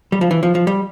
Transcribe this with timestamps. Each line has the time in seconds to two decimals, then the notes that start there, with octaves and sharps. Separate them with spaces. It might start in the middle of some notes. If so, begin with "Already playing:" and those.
0.12 G3
0.21 F3
0.31 E3
0.43 F3
0.55 F3
0.67 G3